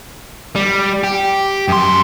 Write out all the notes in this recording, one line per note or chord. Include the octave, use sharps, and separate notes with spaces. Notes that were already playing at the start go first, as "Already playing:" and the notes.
G3
G4
F#2 C6